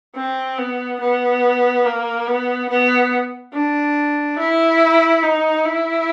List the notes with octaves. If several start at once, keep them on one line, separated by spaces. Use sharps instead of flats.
C4
B3
B3
A#3
B3
B3
D4
E4
D#4
E4